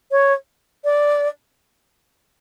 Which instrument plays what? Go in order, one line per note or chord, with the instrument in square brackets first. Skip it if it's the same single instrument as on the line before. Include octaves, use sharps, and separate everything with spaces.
[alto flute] C#5
D5